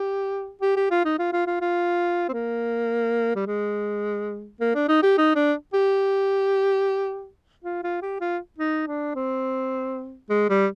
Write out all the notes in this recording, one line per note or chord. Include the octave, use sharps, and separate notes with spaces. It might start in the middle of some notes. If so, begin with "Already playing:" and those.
Already playing: G4
G4
G4
F4
D#4
F4
F4
F4
F4
C4
A#3
G3
G#3
A#3
D4
D#4
G4
D#4
D4
G4
F4
F4
G4
F4
D#4
D4
C4
G#3
G3